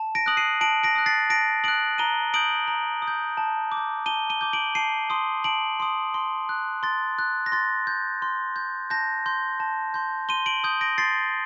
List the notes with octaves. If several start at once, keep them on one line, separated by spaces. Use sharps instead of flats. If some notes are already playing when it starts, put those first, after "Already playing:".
Already playing: A5
A#6 D7
D#6 F#6 F#7
C7 D#7
A5 D7 F#7
A#6 D7
D#6 F#6
A6 C7
A5 A#6 D7
D#6 F#6 D7 F#7
A#5 D#7 G7
D#6 G6 D7 F#7
A#5
D#6
G6
A5
D6
G6
A5 D#7 G7
D#7 G7
D6 G6
D7 F#7
A5 C7 D#7
C6 D#6
A5 D7 F#7
C6 D#6
C6
F#6
C6 A6
F#6
A#6
C6 A6
G6
C6
G6
A5 G6 A#6
C6 G6
A5
C6 G6
C6 D#7 G7
D7 F#7
D#6 G6
A#6 D7
C6 A6 C7